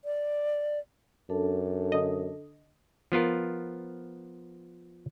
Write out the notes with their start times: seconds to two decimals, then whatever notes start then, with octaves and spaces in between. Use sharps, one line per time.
0.05 D5
1.30 F#2 D4 A4 A5
1.92 D3 D#5
3.12 F3 B3 F4 A#4